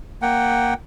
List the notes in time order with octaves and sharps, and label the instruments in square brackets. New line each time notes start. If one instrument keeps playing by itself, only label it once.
[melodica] A#3 F#5 G5